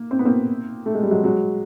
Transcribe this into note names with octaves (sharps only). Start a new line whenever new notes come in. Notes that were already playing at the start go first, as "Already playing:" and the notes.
Already playing: A#3
C4
B3
A#3 C4
A3
G#3
G3
F#3 G#3
F#3 G#3